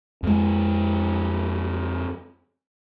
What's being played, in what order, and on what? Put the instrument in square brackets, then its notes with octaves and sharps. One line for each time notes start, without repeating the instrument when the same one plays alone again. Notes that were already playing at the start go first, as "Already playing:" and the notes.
[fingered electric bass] F2 G#3